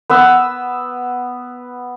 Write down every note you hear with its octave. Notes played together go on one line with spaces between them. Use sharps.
B3 B4 E6